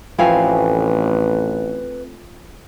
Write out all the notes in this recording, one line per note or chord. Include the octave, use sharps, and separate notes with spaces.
A1 F3 A3 C4 B4 F5 G#5 B5